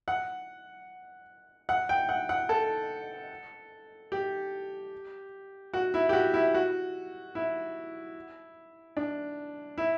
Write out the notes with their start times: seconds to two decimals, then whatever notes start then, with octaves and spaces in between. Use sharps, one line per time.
0.08 F#5
1.69 F#5
1.89 G5
2.09 F#5
2.29 F#5
2.49 A4
4.12 G4
5.74 F#4
5.94 E4
6.09 G4
6.13 F#4
6.34 E4
6.54 F#4
7.35 E4
8.97 D4
9.78 E4